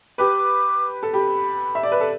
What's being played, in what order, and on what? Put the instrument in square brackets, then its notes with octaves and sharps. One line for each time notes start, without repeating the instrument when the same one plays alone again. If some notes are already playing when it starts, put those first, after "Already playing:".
[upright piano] G4 B4 [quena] D6
[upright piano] A4
[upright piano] G4 [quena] B5
[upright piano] E5
D5
B4
A4